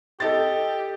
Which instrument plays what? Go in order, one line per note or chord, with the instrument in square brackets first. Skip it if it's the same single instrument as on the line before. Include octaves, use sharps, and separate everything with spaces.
[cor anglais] G4 [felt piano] A4 D#5 A6